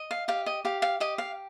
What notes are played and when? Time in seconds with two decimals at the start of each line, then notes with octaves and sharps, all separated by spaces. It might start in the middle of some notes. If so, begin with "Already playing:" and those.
Already playing: D#5
0.11 F5
0.28 G4 F5
0.46 D#5
0.65 G4 F5
0.82 F5
1.00 G4 D#5
1.18 F5